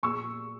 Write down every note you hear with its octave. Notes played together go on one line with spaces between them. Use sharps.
A#2 C#6 E6